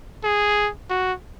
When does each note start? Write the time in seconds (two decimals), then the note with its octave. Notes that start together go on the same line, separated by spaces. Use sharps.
0.24 G#4
0.90 F#4